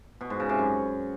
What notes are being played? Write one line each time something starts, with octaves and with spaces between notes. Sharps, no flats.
B2
G#2
C#3
C3
F#2